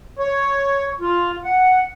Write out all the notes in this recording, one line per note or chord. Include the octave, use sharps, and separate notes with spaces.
C#5
F4
F#5